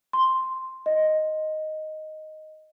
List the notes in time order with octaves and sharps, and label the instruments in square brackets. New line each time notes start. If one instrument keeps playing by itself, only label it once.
[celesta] C6
D#5